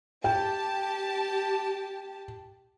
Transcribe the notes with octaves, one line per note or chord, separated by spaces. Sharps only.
G4 G5 A5